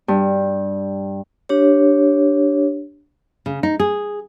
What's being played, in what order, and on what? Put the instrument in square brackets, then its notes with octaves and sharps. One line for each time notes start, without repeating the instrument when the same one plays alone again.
[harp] G2
[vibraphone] D4 G4 C#5
[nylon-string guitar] C#3
D#4
G#4